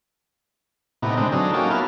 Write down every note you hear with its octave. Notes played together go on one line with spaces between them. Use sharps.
A2 C3 B3 D#4
D3 G#3 C4
F#3 D4 D#4 G#4 A4
A#3 C#4 D#4 F#4 G4 A4
A#3 B3 E4 A5 F6